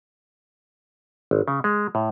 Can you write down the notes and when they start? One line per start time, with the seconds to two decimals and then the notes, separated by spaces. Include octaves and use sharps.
1.31 G#1
1.48 C#3
1.64 G#3
1.95 A2